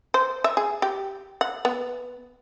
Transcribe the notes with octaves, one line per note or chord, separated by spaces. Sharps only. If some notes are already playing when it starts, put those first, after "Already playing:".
C5
E5
G#4
G4
F#5
B3